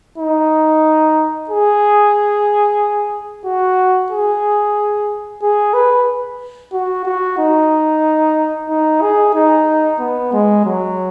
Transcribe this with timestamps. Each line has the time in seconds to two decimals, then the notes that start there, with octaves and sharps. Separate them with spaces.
0.18 D#4
1.50 G#4
3.45 F#4
4.11 G#4
5.42 G#4
5.74 B4
6.73 F#4
7.05 F#4
7.38 D#4
8.69 D#4
9.02 G#4
9.34 D#4
10.00 B3
10.33 G#3
10.65 F#3